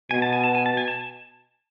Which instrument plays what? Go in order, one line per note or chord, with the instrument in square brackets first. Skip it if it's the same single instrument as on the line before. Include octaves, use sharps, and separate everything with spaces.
[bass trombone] B2 [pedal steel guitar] G#5
[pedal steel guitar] A5
G#5
A5
G#5
A5
G#5
A5